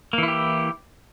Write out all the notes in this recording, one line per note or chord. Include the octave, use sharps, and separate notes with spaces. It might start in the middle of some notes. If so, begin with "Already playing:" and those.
E3 A#3 E4 G4